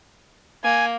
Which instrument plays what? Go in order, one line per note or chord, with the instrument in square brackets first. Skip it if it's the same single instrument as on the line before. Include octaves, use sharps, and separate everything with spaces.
[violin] A#3 [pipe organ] G#5